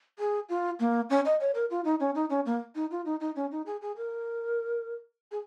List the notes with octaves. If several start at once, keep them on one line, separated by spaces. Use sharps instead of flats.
G#4
F4
A#3
C#4
D#5
C#5
A#4
F4
D#4
C#4
D#4
C#4
A#3
D#4
F4
D#4
D#4
C#4
D#4
G#4
G#4
A#4
G#4